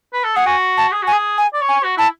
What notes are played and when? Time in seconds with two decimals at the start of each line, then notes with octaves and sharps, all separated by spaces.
0.13 B4
0.24 A4
0.35 G#4 F#5
0.46 F#4 G#5
0.77 A5
0.92 G#4
1.02 F#4
1.07 G#5
1.12 G#4
1.38 G#5
1.53 D5
1.61 C#5
1.69 G#5
1.83 F#4
1.97 E4 A5